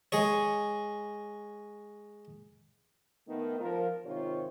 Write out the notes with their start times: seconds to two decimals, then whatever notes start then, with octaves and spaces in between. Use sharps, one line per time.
0.12 G#3 G#4 C#5
3.27 D#3 A3 B3
3.58 F3 A#4
4.05 G#2 C3 D#3 F4 C5 C#5